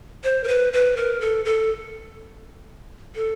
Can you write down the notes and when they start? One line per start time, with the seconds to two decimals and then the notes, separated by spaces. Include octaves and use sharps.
0.24 C5
0.44 A#4
0.48 B4
0.73 B4
0.97 A#4
1.21 A4
1.45 A4
3.15 A4